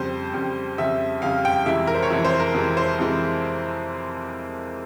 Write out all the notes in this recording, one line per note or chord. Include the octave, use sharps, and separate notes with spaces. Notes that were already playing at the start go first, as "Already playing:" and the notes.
Already playing: F2 C#3 G3 C5
F2 C#3 G3
F2 C#3 G3 E5
F2 C#3 G3 F5
G5
F2 C3 E3 G#3 E5
A#4
C5
C#5
F2 C3 E3 G#3 E5
C5
A#4
F2 C3 E3 G#3
C5
F2 C3 E3 G#3